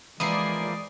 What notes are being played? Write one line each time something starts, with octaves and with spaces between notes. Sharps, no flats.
E3 F3 G#3 A#3 E4 D5 D#6 C7